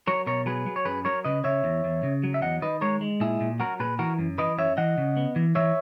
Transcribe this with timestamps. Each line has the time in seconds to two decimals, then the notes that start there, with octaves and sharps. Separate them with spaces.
0.07 F#3 A#4 C#5
0.27 B2 A#4 C#5
0.46 F#3 G#4 B4
0.66 F#3
0.76 C#5
0.85 F#2 G#4 B4
1.05 F#3 A#4 C#5
1.25 C#3 B4 D#5
1.44 C#3 C#5 E5
1.64 E2
1.84 E2
2.03 C#3
2.24 F#3
2.34 E5
2.42 E2 D#5 F#5
2.61 D#3 B4 D#5
2.81 G#3 A#4 C#5
3.01 G#3
3.20 A#2 E4 G#4
3.41 A#2
3.60 F#3 F#4 A#4
3.80 A#2 G#4 B4
3.99 E3 F#4 A#4
4.19 F#2
4.38 E3 B4 D#5
4.58 F#2 C#5 E5
4.77 E3 D#5 F#5
4.98 C#3
5.17 B3
5.36 E3
5.55 E3 C#5 E5